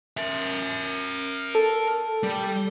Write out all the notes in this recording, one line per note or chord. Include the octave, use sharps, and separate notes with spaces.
A#4 E5
A4
G3